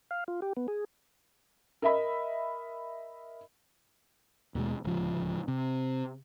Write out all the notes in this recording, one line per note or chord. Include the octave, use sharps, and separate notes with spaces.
F5
F4
G4
B3
G#4
A#4 D#5 E5 B5
D#2 B2 G#3
D1 C#2 F3
C3